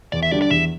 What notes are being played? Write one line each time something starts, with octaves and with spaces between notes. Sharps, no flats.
E2 D5
E5
D3 G3 D4 G4 D5
D5
E2 E5